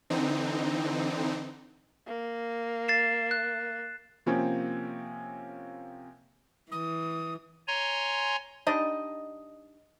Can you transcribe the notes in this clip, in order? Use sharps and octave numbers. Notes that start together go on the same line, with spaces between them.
D3 E3 C4 D#4
A#3
A6 C7 E7
F#6
C3 F3 A#3 C4 C#4
E3 D#6
C#5 G#5 A#5 C6
G3 D4 D#4 D#5